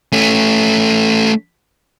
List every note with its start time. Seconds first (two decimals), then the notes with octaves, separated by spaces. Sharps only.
0.12 A3 C#4